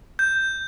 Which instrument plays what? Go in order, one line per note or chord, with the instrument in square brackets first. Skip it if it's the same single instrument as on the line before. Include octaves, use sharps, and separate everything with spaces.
[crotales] G6